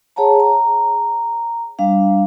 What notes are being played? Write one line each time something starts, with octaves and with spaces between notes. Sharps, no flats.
G#4 C#5 F#5 A5 A#5
A#5
G3 D4 F5